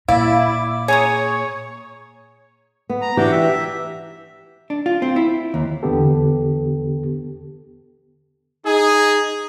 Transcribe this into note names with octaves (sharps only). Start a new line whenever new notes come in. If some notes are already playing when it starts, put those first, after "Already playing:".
A#2 E4 D5 F5
G#4 C#5 A#5 D#6
B3
A#5
E3 D4 F#4 G4 G5
E5
D4
F4
C4
E4
D#2
E2 D3 B3 G4 A4
D#4 G#4